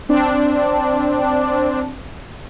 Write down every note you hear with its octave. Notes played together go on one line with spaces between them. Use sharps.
C4 D4